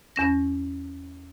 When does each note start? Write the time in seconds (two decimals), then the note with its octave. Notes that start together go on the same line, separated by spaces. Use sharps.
0.16 E2 C#4 A#6